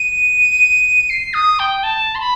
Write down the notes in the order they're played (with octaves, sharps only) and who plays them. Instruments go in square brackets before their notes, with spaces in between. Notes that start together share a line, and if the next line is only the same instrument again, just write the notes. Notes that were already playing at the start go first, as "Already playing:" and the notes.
Already playing: [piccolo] D#7
C7
D#6
G5
A5
C6
B5